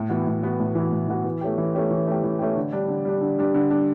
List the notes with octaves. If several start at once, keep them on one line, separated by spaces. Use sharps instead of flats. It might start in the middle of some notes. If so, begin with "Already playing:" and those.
Already playing: A2
E3 B3 F#4
A2
E3 B3 F#4
A2
E3 B3 F#4
A2
E3 B3 F#4
E3
A3 C#4 G4
E3
A3 C#4 G4
E3
A3 C#4 G4
E3
A3 C#4 G4
D3
G3 D4
D3
G3 D4
D3
G3 D4
D3
G3 D4